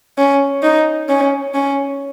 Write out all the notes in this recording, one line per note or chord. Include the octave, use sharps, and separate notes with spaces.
C#4
D#4
C#4
C#4